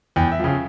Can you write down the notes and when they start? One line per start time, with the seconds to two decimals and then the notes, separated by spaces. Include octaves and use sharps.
0.16 E2 G5
0.32 E5
0.40 C#3 F3